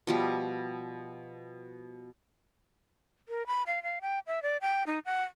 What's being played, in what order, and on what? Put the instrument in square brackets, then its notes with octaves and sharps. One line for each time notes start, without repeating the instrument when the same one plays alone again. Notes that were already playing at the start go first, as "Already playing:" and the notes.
[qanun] B2 F3 G3
[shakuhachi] A#4
B5
F5
F5
G5
E5
D5
G5
D#4
F#5